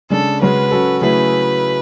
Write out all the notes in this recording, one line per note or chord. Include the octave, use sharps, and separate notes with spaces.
C#3 G#3 D4 A4
C#3 G#3 C#4 F#4 B4
F#3 C#4 F#4 A4
C#3 F#3 A3 E4 G#4 B4